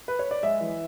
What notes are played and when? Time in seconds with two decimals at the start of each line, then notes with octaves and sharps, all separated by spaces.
0.08 B4
0.19 C#5
0.31 D5
0.43 G#3 E5
0.61 E3